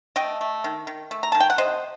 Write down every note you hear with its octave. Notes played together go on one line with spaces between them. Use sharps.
A3 D#5 G5
A3
D#3
D#3
A3
A#5
D#3 A5
G5
F#5
C3 C5 D#5